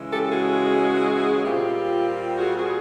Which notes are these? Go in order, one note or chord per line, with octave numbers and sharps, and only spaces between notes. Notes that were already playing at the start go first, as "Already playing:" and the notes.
Already playing: C#3 E3 G#3 C#4
G4 A4
A4
F#4 G#4
F#4
A#2 G3 C4 F4 G4
F#4 G#4
F#4 G#4